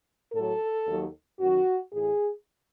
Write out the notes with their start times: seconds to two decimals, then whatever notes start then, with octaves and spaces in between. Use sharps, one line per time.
0.33 A2 F#3 A4
0.87 D#2 D#3 F#3
1.40 F#2 D#3 F#3 F#4
1.93 A2 E3 G#4